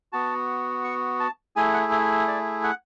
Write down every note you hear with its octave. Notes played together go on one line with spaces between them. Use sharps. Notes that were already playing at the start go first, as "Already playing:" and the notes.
B3 F#4 A5
C#6
A5
A3 E4 G#4 G#5
F#5
E5
D5
F#5